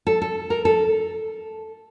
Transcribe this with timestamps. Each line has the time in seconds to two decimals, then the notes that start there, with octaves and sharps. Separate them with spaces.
0.07 A4
0.22 A4
0.50 A#4
0.65 A4